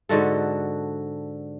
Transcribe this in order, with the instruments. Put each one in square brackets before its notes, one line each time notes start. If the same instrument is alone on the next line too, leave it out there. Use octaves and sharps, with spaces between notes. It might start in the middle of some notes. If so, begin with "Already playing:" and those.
[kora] G#2 D3 F#4 A4